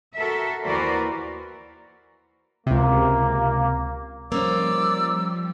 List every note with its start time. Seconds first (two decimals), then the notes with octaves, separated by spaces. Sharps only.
0.15 F#4 A4 A#4 E5
0.64 D#2 E3 F#4 A#4 C5 D5
2.66 C#2 C3 A#3
4.32 F3 G3 A#3 C#4 C5 D5 E6